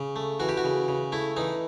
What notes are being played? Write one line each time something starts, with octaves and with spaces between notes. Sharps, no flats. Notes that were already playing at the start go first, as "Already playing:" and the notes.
Already playing: C#3
A3
E3 F#4
G4
F#4
C#3
C#3
A3 E4
E3 D#4